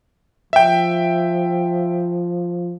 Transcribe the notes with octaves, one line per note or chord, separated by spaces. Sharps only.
F3 E5 G5